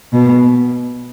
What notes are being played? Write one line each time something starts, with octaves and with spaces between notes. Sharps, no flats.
B2